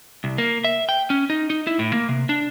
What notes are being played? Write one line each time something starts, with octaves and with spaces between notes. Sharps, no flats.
C2
A#3
E5
G5
C#4
D#4
D#4
E4
A2
A#3
C3
D4